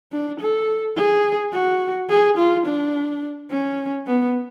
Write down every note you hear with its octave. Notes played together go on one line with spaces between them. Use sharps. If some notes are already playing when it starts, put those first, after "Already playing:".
D4
A4
G#4
F#4
G#4
F4
D4
C#4
B3